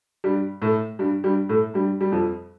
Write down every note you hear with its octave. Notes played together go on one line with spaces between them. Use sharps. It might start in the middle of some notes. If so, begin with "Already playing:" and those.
G2 G3
A2 A3
G2 G3
G2 G3
A2 A3
G2 G3
G3
F2 F3